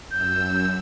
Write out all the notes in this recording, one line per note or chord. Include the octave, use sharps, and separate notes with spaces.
F#2 E6 G6